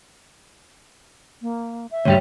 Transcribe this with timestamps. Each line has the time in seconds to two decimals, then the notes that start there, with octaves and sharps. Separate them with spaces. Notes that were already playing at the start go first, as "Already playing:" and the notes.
1.42 A#3
1.91 E5
2.05 D2 G2 G3 C#5 G5